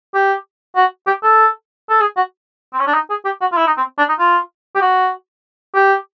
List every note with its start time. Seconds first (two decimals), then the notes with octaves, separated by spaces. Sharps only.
0.14 G4
0.76 F#4
1.07 G4
1.23 A4
1.90 A4
2.01 G#4
2.17 F#4
2.73 C4
2.79 C#4
2.87 D4
2.94 D#4
3.10 G#4
3.25 G4
3.41 F#4
3.52 F4
3.57 E4
3.67 D#4
3.77 C4
3.98 D4
4.09 D#4
4.19 F4
4.75 G4
4.82 F#4
5.75 G4